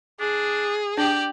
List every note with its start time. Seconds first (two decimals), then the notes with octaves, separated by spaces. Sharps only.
0.20 D4 G#4
0.98 D4 G4 D5 G5